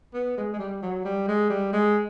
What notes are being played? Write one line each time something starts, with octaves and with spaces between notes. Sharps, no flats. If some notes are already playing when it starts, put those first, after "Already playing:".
B3
G#3
G#3
G3
F#3
G3
G#3
G3
G#3